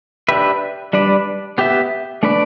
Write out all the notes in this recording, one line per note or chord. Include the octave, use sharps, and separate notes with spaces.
D4 G4 B4 E5
G3 D4 B4 D5
B3 G4 E5
A3 D4 B4 D5